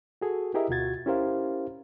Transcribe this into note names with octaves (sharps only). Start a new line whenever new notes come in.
F#4 G#4 A4
E4 G4 G#4 A#4 D#5 E5
D2 B2 F4 F#4 G#6 A6
C#4 E4 G4 A#4 C5 F5